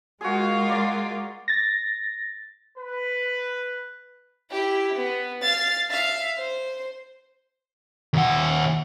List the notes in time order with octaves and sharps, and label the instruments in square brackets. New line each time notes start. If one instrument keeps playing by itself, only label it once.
[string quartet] G#3 A#3 F4 [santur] F#4 G#4
[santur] D5 A#5 [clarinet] D6
[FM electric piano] A6 A#6
[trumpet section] B4
[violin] E4 G4
B3
F5 A6
E5 F5
C5
[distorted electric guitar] D#2 F#5